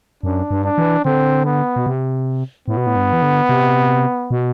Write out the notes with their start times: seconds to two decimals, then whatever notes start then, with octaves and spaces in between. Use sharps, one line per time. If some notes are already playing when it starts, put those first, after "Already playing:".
0.23 F#2 D4
0.51 G2
0.64 D4
0.78 E3
1.05 D3 C4
1.46 B3
1.76 B2
1.86 C3
2.68 A2 B3
2.77 B2
2.87 A2
2.96 G2
3.13 E3
3.22 D3
3.49 C3
4.31 B2